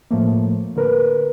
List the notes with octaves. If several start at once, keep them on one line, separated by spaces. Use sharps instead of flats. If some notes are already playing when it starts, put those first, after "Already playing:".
A2 F3 A3 A#3
D3 A#4 B4